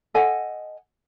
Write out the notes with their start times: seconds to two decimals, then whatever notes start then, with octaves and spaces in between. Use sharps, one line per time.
0.14 A4 D#5 F#5 G#5